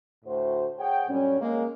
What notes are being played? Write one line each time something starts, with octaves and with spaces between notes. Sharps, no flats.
D2 A2 F#4 C5
G#4 C#5 F#5 G5
F#2 A#2 G3 C#4
G#3 A#3